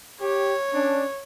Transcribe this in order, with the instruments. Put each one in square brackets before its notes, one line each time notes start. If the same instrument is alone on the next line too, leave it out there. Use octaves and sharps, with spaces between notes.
[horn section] G4 [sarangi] C#5
[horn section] C#4 D4